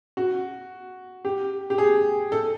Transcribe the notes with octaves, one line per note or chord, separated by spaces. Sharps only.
F#4
G4
G4
G#4
A4